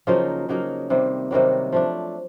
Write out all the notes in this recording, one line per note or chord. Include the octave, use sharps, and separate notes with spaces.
C#3 F3 F#3 A#3 D#4 F4
C#3 F#3 A#3 D#4
C3 D#3 G3 A#3
C3 D#3 F#3 G3 A#3 F#4
F3 A3 D4